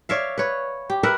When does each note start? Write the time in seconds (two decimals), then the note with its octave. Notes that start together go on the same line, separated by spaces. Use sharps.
0.09 C#5 D5 E5 F5
0.38 B4 C#5
0.90 G4
1.03 A#4 B4 E5 F#5